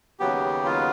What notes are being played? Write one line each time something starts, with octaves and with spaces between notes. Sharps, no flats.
D#2 C#3 F#3 B3 G4
F4